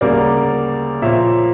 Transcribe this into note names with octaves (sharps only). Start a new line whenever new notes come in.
D2 C#3 G3 A#3 A#4 D5
A#2 F3 A#3 C#5 E5